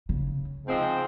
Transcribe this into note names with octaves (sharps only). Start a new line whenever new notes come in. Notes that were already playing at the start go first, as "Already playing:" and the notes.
C#3
G#2 F3 G#3 C4